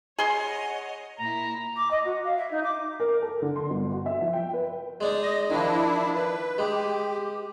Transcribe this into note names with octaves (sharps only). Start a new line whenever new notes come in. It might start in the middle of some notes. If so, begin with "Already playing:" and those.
G#4 C#5 D#5 F#5 C6
A#2 E4 A#5
D6
D#5
F#4
F5
E5
D#4
D6
A#4
A4
D3
C6
G1
F#4
E5
F3
G5
B4
G#3 D4 D#4
D#5
D#3 F3 D4 E4
B4
G#3 G4